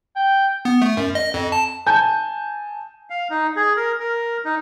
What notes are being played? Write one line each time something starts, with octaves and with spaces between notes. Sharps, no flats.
G5
B3
A3
F#2
D#5
F2
A5
G#5 A5 G6
F5
D#4
G#4
A#4
A#4
D#4